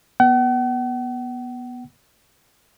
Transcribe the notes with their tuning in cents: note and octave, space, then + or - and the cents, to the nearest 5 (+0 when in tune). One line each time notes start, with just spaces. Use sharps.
B3 -15 F#5 +45